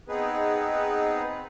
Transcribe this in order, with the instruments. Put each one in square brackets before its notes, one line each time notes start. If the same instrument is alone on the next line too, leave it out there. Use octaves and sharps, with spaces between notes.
[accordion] B3 C4 D#4 G#4 B4